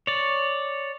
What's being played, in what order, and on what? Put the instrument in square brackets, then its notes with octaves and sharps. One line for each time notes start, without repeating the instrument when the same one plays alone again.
[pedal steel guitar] C#5 D5